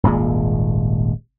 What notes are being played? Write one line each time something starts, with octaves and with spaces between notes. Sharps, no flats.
D#1 G#1 A#2 G#3